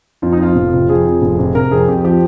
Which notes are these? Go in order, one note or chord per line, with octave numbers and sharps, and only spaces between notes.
F2 F4
D#4
F3 F4
F1
C3
F2 G#4
F3
F1
C3
C3 A#4
F2 G#4
F2 G4
F3 G4